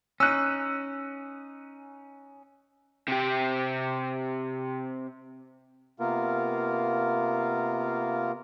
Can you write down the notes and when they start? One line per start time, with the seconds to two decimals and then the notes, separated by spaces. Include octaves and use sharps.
0.20 C#4 D#4 E6 F#6
3.08 C3 G4
6.00 C3 A#3 B3 F4 A#4